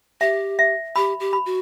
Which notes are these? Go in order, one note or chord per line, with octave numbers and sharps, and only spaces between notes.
G4 E5
E5
G4 B5
G4
B5
F#4